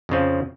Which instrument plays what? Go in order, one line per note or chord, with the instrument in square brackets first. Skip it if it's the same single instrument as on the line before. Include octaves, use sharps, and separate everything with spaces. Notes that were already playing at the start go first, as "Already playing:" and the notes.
[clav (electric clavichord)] F2 C#3 F3